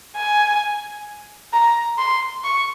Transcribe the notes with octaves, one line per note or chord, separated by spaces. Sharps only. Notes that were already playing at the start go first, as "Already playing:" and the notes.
G#5
A#5
C6
C#6